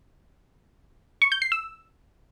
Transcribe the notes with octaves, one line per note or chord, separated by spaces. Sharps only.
C#6
G6
C7
E6